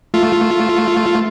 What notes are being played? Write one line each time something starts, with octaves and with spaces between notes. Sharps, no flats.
A3 F4